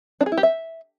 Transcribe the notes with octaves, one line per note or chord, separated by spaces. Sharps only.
D4
G#4
E4
G4
E5